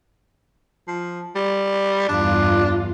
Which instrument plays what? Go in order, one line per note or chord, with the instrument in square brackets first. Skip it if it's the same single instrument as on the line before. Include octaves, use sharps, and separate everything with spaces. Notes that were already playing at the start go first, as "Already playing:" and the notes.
[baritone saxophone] F3
G3
[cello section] E2 G2 F4 [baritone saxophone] D4